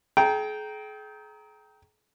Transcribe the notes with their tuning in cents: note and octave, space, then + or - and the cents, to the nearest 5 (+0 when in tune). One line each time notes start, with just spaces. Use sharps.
G#4 +40 G5 -10 A#5 +0